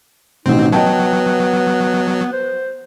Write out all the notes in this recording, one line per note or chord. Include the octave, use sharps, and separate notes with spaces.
A1 B2 D#3 C4 D#4
F#3 B3 B4 D#5 G5 A5
C5